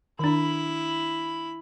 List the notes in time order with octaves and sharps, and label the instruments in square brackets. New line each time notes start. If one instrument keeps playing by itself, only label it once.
[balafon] D#3 D4 [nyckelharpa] E4 B5